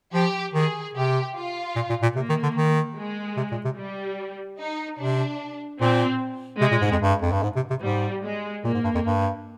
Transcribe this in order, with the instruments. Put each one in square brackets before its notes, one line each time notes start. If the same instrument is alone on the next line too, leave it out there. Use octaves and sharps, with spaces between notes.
[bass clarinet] F3 [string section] G4
[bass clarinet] D#3 [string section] G#4
[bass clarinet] C3 [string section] G4
[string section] F4
[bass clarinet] A#2
A#2
A#2
[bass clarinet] C3 [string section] A#3
[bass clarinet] D#3
D3
D#3
[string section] G#3
[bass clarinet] C3
A#2
C3
[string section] G3
D#4
[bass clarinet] C3 [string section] D4
[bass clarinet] A#2 [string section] C4
[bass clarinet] C3 [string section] G#3
[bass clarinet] A#2
G#2
F2
G2
F2
G2
G#2
C3
C3
[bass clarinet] G#2 [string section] G3
[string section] G#3
[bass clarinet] A#2 [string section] A#3
[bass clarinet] G#2
G2
F2
G2